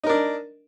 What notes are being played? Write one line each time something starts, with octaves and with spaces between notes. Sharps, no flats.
D4 D#4 A#4